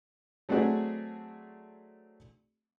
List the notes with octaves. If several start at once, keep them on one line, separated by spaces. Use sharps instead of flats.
F#3 A3 C4 D4 F#4 G#4